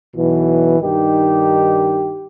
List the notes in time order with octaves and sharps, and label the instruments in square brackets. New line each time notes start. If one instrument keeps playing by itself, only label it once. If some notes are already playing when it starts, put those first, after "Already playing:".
[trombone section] B1 B2 E3
G2 D#3 D#4 G4